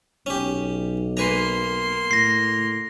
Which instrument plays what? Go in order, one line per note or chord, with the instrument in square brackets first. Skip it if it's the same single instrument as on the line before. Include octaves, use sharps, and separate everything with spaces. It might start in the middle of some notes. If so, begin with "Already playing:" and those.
[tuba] B1 [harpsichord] C#4 G4
[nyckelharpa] A#3 C6 [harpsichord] B4 G#5 A#5
[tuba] A2 [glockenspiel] A#6 C7